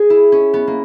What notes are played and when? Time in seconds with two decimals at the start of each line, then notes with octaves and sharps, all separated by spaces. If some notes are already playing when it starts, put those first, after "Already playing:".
Already playing: G#4
0.10 E4
0.32 C#4
0.54 B3
0.67 A#3